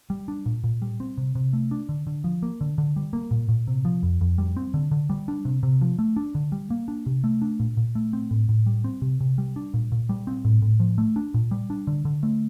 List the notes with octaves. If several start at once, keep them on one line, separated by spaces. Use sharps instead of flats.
G3
D4
A#2
A#2
G3
C4
C3
C3
A3
D4
D3
D3
F3
A#3
D3
D3
G3
A#3
A#2
A#2
C3
F3
F2
F2
G3
C4
D3
D3
G3
D4
C3
C3
F3
A3
D4
D3
G3
A#3
D4
C3
A3
D4
A#2
A#2
A3
C4
A2
A2
G3
C4
C3
C3
G3
D4
A#2
A#2
G3
C4
A2
A2
F3
A3
D4
A#2
G3
D4
D3
D3
A3